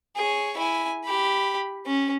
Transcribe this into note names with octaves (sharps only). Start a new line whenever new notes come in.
G#4 C#5
E4 G#5
G4 B5
C#4